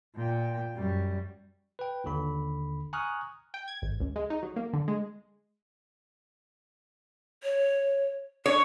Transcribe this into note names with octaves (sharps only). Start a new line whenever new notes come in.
A#2 G5
F#2 G3
B4 G5
G1 D#2 D3 B5
G#5 A#5 C#6 D#6 F6 F#6
G5
G#6
G#1
C#2
G#3
D#4
F#3
A#3
D3
G#3
C#5
D4 C#5